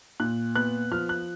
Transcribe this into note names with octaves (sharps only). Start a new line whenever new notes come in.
A#2 F#6
B3 F#6
F3 F6
F#6